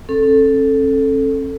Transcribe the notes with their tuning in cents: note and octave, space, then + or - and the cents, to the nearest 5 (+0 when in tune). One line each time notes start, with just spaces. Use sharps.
C#4 -45 A4 +0